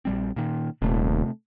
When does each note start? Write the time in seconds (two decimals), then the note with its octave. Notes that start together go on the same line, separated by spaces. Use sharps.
0.05 A#1 G3 C4
0.36 A#2 D#3
0.82 D#1 C3 A3